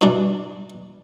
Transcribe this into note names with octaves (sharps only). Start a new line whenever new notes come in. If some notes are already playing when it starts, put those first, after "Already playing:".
G2 B2 E3 D4